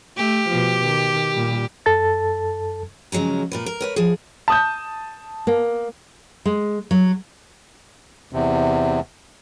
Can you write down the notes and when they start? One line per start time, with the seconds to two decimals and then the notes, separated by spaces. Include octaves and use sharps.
0.17 A3 G4
0.49 B2 F3
0.85 D#3
1.33 A#2 G3
1.86 F#2 A4 A5 A6
3.12 C#3 F3 F#3 G#3 A#5
3.52 A#2 A#4 B4
3.66 A#4
3.81 A#4 B4 C#5
3.96 F3 G#4
4.48 A5 D#6 G6
5.47 A#3
6.46 G#3
6.91 F#3
8.33 E2 C3